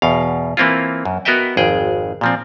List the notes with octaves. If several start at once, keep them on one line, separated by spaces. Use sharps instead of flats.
E2 B2 F5
E3 A#3 C4 E4 F4
F#2
B3 F#4 A#4 D#5 E5 G5
G#1 F2 G#4 G5
A#2 F3 C4